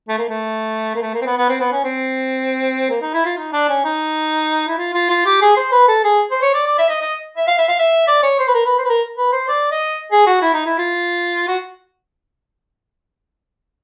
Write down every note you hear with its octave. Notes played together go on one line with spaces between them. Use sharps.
A3
A#3
A3
A#3
A3
A#3
C4
B3
B3
C4
B3
C#4
C4
A#3
D#4
E4
F4
D#4
D4
C#4
D#4
E4
F4
F4
F4
G4
G#4
C5
B4
A4
G#4
C5
C#5
D5
D5
E5
D#5
D#5
E5
F5
E5
F5
E5
D5
C#5
C5
B4
A#4
B4
C5
B4
A#4
B4
C5
D5
D#5
G#4
F#4
E4
D#4
E4
F4
F#4